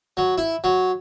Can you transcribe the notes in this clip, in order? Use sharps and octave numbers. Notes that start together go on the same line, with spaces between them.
F#3
E4
F#3